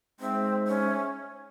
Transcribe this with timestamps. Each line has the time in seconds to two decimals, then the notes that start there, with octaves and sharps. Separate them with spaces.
0.20 G#3 C4 D#4 G#4 C5 E5
0.67 C#4